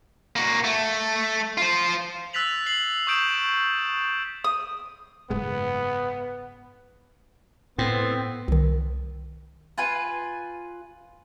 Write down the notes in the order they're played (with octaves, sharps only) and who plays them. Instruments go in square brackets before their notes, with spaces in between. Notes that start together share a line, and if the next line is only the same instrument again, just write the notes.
[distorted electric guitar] A#3 F#4
A3
F4 C5
[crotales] E6 F#6 A6 B6 F7 F#7
C7 F#7
C#6 D#6 G6 D7 E7
[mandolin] D#6
[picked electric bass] F#1 G#2 G#3 [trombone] B3
[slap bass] A2 [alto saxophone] B3 [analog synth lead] C4
[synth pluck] C2 D#3
[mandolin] F4 B4 G#5